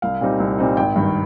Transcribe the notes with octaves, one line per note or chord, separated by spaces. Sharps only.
C2 F5
A#2 G3 C4 D#4
C2
A#2 G3 C4 D#4
G#1 G5
G2 D#3